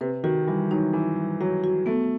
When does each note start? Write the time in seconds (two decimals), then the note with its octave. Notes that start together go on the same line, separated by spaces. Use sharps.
0.01 C3 B4
0.24 D#3 F#4
0.47 E3 G3
0.71 F#3 D#4
0.93 E3 D#4
1.16 G3
1.40 F#3 F#4
1.64 F#4
1.86 A3 B3